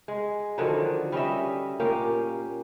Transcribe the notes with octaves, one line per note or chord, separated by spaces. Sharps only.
G#3
D3 D#3 F3 F#3
G3 C#4 D#5 E5
A#2 A#3 C#4 G4